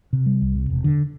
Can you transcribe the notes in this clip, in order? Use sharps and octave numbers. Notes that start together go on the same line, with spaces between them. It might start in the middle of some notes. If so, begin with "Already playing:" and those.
C3
G3
C2
C3
E1
D3